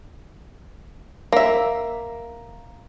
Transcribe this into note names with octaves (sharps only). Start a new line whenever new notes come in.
A#3 E5